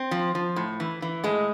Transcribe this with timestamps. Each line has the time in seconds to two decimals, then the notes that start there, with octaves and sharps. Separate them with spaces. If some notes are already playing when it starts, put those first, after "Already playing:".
Already playing: C4
0.11 F3
0.35 F3
0.56 A2
0.80 E3
1.02 E3
1.24 A2 G#3